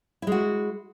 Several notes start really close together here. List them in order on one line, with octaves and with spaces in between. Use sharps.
E4 G#3 F#4